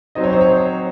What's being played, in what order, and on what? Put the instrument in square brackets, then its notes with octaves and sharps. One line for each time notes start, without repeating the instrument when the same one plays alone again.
[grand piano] F#3 C4 D#4 [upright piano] D#5
[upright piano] C#5
C5
C#5